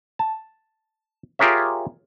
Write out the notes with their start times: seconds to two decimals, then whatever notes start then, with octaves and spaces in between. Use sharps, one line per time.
0.19 A5
1.39 F4 G4 G#4 A#4 C#5 E5